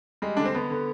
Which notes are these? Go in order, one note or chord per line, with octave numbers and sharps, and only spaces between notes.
G3 G#3
D3 D4
C4
D3 B3
D3